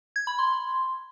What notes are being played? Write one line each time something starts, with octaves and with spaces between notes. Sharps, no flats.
G#6
B5
C6